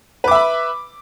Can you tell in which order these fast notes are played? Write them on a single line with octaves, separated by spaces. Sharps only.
B4 D6 E5 B5